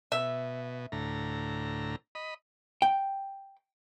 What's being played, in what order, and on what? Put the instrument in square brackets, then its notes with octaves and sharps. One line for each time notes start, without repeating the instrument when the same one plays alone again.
[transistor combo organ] B2 [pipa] E5
[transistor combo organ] D2 A2 A#5
D#5 B5
[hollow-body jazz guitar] G5